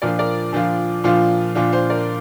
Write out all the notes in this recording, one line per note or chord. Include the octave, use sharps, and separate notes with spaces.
A#2 F3 D4 F4 A#4 D5
A#4 D5
A#2 F3 D4 F4
A#2 F3 D4 F4
A#2 F3 D4 F4
C5 F5
A#4 D5